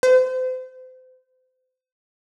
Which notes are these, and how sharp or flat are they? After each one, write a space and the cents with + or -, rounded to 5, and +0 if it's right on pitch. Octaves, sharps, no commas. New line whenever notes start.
C5 -35